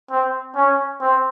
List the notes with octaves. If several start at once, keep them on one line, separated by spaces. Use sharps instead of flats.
C4
C#4
C4